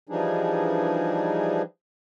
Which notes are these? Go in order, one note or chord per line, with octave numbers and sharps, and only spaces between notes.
E3 F3 G3 D4 D#4 G#4